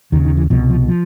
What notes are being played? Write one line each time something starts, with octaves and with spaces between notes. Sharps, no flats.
D#2 C#3 D#3
D#3
E3
C2 B2 F3
F3
F3